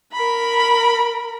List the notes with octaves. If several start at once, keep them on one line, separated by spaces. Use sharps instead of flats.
A#4 B5